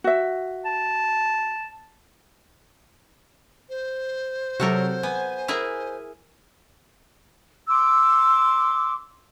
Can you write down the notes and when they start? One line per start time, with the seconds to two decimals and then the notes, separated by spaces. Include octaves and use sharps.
0.04 F#4 E5
0.65 A5
3.69 C5
4.60 C3 F#3 F#4 A4 A#4
5.03 B3 G#5
5.48 E4 G#4 A#4
7.67 C6 D6 E6